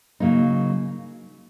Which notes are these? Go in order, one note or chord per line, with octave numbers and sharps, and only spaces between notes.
C#3 F#3 A#3 D#4